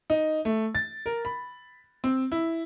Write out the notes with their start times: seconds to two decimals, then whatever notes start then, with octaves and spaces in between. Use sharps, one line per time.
0.10 D#4
0.45 A3
0.75 A6
1.06 A#4
1.25 B5
2.04 C4
2.32 E4